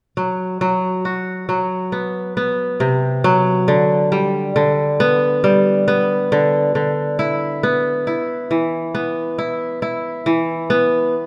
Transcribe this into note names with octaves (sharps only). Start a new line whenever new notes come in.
F#3
F#3
F#4
F#3
B3
B3
C3
F#3
D3
G3
D3
B3
G3
B3
D3
D3
E4
B3
E4
E3
B3
E4
E4
E3
B3